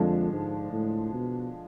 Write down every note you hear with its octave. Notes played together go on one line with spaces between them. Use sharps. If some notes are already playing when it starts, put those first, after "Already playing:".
Already playing: F2 D3 F3 G#3 D4
G#2
A2
B2